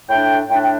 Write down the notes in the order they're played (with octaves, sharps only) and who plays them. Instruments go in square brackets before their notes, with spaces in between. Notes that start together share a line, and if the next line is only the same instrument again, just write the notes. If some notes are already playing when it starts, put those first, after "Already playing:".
[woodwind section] A2 A3 D4 G5
A2 A3 D4 G5
G5